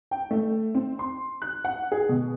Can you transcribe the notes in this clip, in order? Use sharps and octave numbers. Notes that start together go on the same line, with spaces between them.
G5
A3
C4
C6
F#6
F#5
G#4
B2